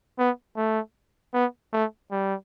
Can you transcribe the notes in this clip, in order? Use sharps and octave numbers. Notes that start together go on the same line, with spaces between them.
B3
A3
B3
A3
G3